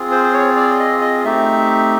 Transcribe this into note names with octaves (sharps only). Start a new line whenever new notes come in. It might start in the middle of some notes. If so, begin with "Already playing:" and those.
Already playing: C4 F4 G#4
C5
C5
C#5
D5
D#5
D#5
A3 C4 D#4 G4 E5